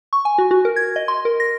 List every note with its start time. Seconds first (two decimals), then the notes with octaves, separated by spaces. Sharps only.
0.13 C#6
0.25 G#5
0.38 F#4
0.51 F#4
0.65 A#4
0.76 G#6
0.96 D#5
1.08 C6
1.25 A#4
1.40 A#6